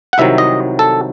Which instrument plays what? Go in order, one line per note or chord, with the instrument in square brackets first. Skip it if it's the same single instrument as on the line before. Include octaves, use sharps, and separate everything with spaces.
[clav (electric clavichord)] F#5
C2 C3 D#3 F#3 E5
D#5
A4